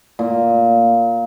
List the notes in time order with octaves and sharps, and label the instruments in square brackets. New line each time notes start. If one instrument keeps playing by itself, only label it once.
[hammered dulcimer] A#2